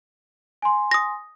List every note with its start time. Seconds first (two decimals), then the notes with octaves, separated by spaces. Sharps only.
0.62 G#5 C6
0.91 D#6 A#6